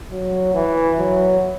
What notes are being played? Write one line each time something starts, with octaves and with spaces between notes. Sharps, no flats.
F#3
E3
F#3